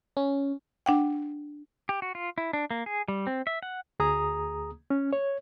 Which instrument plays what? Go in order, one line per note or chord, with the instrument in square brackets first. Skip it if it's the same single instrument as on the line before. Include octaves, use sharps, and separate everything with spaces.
[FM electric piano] C#4
[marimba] D4 F#5 G5
[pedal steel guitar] G4
F#4
F4
E4
D4
A#3
G#4
G3
C4
E5
F#5
[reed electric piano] D2 G#4 A#5 D#6
C#4
C#5